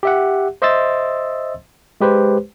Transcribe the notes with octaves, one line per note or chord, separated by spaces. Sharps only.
G4 E5 F#5
C5 D#5 E5 C6 E6 A6
G#3 G4 B4 C5